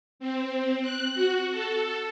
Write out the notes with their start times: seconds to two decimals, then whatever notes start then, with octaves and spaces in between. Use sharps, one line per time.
0.20 C4
0.82 F#6
1.15 F#4
1.51 A4